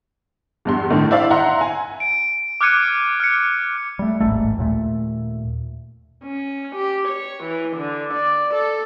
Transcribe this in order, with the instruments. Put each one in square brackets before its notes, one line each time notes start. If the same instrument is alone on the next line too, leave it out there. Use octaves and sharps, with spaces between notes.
[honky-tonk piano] E2 G2 C6
A2 D3 D#3
E4 C5 D5 E5 F5
E5 F#5 A#5 C6
G#5
[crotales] D7
D6 F6 F#6 G#6 C#7 D#7
F6 C#7
[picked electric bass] G3 A3
D#1 A1 G#2 A3
D#2 A#2 A3
[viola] C#4
G4
C#5
E3
D3
D5
A4